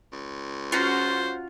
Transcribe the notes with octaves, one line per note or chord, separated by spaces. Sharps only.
C#2
C#4 F4 F#4 C5 F#5 A#5